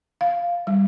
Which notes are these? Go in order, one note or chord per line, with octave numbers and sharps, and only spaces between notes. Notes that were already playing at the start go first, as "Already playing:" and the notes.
F5
G3